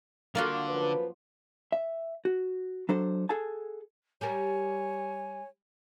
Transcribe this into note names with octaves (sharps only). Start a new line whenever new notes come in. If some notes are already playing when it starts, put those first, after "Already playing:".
D3 A#3 F4 F#4
F#2 F3 B4
E5
F#4
F#3 D4 A4 C5
G#4 A4 F#5 G#5 A5
G3 G4 A#4 C#5 G#5